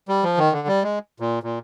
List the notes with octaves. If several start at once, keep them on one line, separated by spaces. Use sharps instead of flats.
G3
F3
D#3
D3
G3
G#3
A#2
A#2